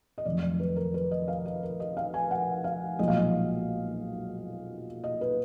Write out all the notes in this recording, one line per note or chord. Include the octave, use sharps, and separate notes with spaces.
D#5
F1 F2 D#3 F#3 D5
D5
B4
A#4
B4
D#5
F5
D#5
A#4
D#5
F5
G#5
F#5
F5
B1 A#2 F3 G#3 D#5
F5
D#5
D#5
B4